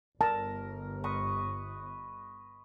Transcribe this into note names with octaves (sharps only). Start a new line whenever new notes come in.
G1 A#4 A5
B4 D#5 C#6